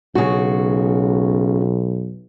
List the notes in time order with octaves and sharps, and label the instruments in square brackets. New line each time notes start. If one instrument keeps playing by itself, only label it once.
[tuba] B1 [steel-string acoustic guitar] C#3 F#4